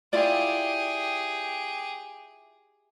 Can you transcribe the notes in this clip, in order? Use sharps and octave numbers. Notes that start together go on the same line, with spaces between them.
E4 F4 G4 G#4 D5